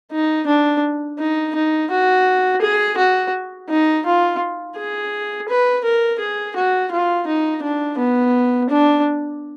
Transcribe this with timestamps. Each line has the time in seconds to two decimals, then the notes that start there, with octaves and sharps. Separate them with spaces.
0.12 D#4
0.47 D4
1.19 D#4
1.55 D#4
1.91 F#4
2.61 G#4
2.97 F#4
3.69 D#4
4.06 F4
4.76 G#4
5.49 B4
5.84 A#4
6.19 G#4
6.56 F#4
6.91 F4
7.27 D#4
7.63 D4
7.98 B3
8.70 D4